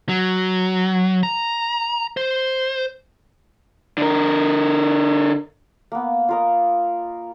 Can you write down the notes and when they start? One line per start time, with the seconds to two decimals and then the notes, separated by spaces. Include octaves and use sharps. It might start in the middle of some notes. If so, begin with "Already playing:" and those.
0.09 F#3
1.23 A#5
2.17 C5
3.98 D3 A#4
5.92 A#3 B3
6.29 F4 A#4 D#5